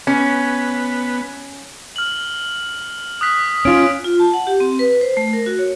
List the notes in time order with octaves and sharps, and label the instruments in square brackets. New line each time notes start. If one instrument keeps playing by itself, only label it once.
[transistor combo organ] B3 [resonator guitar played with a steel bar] C#4
[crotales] F6 F#7
D#6 F#6 B6
[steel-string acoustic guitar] C#4 F4 [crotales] D7
[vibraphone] F4
A5
F#5
G4
C4
B4
C5
A3
A#4
F#4
C#5